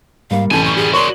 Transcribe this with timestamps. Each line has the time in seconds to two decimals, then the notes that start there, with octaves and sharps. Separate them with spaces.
0.31 G#2 G3 A#3 F5
0.51 C2 F#2 A2 E3 G3 G#5 A5
0.65 C#6
0.77 G4 G#4
0.94 F#4 G#4 A#4 C#5 D5 C6 C#6 F#7